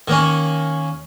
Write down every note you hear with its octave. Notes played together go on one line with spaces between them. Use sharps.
D#3 A#3 C#4